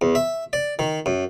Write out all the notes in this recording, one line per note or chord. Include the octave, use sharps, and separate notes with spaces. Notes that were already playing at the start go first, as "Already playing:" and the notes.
E2
E5
D5
D#3
F#2